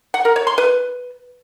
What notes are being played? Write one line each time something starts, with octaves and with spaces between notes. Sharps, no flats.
F#5
A#4
C#5
C6
B4